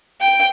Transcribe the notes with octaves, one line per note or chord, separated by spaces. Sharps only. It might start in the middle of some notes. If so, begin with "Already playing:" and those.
G5